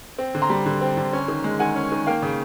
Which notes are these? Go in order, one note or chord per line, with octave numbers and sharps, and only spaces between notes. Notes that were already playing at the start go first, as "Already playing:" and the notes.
C4
D3
A#5 C6
G3
D3
C4
D3
C#4
D#3
G#3
D#3 F#5 G#5
C#4
D#3
A#3 F5 G5
C#3